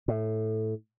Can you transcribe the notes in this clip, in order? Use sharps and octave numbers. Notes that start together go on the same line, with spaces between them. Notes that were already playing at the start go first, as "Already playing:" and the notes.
A2